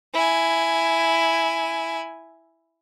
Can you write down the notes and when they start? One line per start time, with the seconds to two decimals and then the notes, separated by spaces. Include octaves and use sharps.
0.14 E4 G#5